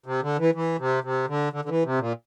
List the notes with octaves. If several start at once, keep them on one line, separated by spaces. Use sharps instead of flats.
C3
D3
E3
E3
C3
C3
D3
D3
D3
E3
C3
A#2